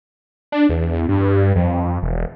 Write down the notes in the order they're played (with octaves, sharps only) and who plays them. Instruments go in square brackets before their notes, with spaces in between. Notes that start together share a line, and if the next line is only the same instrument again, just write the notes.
[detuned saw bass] D4
E2
G2
F2
E1